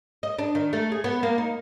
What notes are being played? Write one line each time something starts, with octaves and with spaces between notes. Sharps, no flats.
D#5
D4
D#3
A3
G#4
B3
A#3
D#4